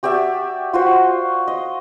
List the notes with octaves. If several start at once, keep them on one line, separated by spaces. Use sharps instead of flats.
F#4 G4 D5 E5
F4 F#4 C5
D#5